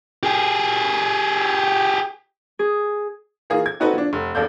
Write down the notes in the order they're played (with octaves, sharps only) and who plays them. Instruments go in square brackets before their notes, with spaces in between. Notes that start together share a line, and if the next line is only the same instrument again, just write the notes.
[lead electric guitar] G4 G#4
[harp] G#4
[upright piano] E3 A#3 F4 G#4
G#6
C4 D#4 F#4 A4 B4
F3 D4
F1
E1 D#2 A4 D5 F5 G6